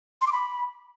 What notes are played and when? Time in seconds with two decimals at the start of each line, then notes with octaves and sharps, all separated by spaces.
0.21 C6
0.27 D6
0.32 B5